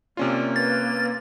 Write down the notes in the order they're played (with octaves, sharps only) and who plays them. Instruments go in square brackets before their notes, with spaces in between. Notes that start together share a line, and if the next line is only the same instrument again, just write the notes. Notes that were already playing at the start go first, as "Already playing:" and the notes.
[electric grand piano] C3 C#4 F4 [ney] A#3 [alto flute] D5
[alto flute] B4 [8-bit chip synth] A6